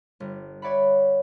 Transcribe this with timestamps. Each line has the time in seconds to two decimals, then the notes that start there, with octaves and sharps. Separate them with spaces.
0.20 G1
0.62 C#5 D5 E5 F#5 B5